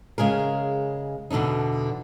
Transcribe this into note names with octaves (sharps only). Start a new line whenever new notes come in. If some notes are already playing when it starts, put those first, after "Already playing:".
C#3 G#3 G#4 A#4
E2 B2 D3 D4 D#4